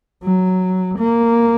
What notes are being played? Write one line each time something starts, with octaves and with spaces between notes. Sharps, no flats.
F#3
A#3